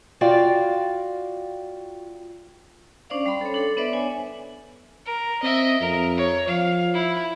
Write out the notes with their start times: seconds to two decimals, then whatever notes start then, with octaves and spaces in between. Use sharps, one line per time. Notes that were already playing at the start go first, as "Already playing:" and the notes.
0.21 F4 F#4 D5 F5 G5
3.10 C#4 D4 C5 D5 F5
3.26 G3 B5 C6
3.41 A4 C#5
3.54 D4 A4
3.77 B3 D4 B4 C5 D5 E5
3.93 D4 C#5 G#5
5.05 A#4
5.43 C4 D#5 E5
5.81 F2 A#4
6.17 C#5
6.48 F3 F5
6.94 E4